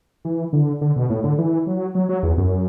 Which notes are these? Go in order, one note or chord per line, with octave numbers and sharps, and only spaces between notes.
E3
D3
D3
B2
A2
D3
E3
F#3
F#3
F#3
E2
F#2